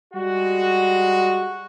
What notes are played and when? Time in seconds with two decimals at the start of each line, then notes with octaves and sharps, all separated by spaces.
0.14 G3 G#3 F#4